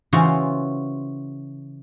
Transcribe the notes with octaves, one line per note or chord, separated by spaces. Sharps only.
C#3 E3 F4 F#4 C5